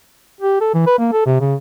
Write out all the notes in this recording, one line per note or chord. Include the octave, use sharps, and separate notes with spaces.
G4
A4
E3
B4
A#3
A4
C3
C#3